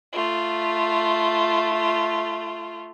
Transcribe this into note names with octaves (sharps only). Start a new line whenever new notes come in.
A3 F4